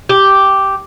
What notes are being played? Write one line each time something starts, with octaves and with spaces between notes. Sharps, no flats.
G4